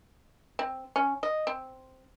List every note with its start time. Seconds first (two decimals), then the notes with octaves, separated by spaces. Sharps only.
0.59 C4
0.96 C#4
1.23 D#5
1.47 C4